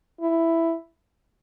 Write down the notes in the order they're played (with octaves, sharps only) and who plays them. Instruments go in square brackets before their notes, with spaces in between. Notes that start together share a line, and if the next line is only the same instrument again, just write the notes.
[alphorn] E4